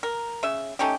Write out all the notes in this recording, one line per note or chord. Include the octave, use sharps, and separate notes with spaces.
A#4
C#3 E5
A3 C#4 D#4 G4